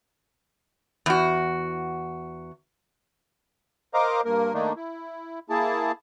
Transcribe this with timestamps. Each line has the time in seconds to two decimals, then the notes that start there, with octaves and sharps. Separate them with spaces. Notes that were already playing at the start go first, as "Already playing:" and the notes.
1.06 E2 F#4
3.94 A#4 C5 D#5 F5 A#5 D6
4.25 G2 A#3 A#4
4.54 D#3 A3 A#3 D4 D#4
4.76 E4
5.49 A#3 E4 G#4 A5